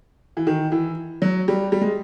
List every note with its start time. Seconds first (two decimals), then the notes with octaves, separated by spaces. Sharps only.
0.37 E3
0.47 D#3
0.72 E3
1.22 F#3
1.48 G3
1.72 G3
1.81 G#3